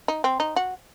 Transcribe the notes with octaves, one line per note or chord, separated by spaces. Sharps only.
D#4
C4
D#4
F#4